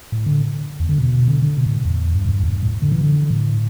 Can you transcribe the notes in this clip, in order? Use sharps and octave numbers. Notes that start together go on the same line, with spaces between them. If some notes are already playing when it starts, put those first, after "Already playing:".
A2
D3
E2
D3
B2
D3
D3
B2
A2
E2
G2
A2
G2
E2
G2
A2
D3
E3
D3
A2